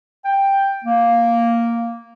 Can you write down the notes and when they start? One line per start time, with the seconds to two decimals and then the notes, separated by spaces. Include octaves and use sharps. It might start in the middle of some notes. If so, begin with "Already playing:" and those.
0.25 G5
0.85 A#3